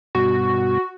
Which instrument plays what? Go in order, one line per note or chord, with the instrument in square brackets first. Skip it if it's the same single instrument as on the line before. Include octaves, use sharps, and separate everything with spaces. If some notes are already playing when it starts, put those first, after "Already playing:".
[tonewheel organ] G2 B2 [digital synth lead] F#4